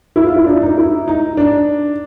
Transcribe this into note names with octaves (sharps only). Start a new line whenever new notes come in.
E4
F4
E4
D4
D#4
E4
D#4
D4